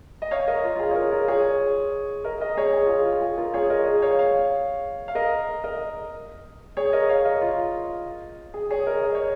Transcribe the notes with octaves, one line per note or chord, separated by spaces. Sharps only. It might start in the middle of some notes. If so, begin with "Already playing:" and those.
D#5
C#5 F5
A#4 D#5
F4
F4
G#4
C#5
F4 A#4
F4 A#4
G#4 C#5
A#4 D#5
A#4 D#5
G#4 C#5
G#4
F4
G#4
F4
G#4
F4 A#4
G#4 C#5
A#4 D#5
G#4 C#5
C#5 F5
C#5 F5
F5
A#4 D#5
A#4 D#5
G#4 C#5
A#4 D#5
C#5 F5
A#4 D#5
F4
G#4
G#4 C#5
A#4 D#5
D#5
C#5